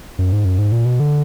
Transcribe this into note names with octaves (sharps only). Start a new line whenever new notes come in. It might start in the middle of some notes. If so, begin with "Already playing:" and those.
F#2
G#2
F#2
G#2
A#2
B2
D3